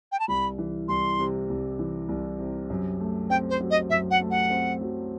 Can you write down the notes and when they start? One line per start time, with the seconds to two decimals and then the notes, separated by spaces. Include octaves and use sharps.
0.12 G5
0.20 A5
0.28 C2 B5
0.58 E3
0.88 C2 C6
1.19 C3
1.49 C2
1.79 E3
2.09 C2
2.39 C3
2.70 F#2
3.00 A3
3.30 C4 G5
3.50 C5
3.60 F#3
3.71 D#5
3.90 F#2 E5
4.11 F#5
4.21 A3
4.31 F#5
4.50 C4
4.81 F#3